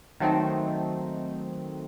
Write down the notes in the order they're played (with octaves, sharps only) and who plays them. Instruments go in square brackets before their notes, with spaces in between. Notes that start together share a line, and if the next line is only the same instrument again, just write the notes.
[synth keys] D#3 F#3 A3 C4 D#4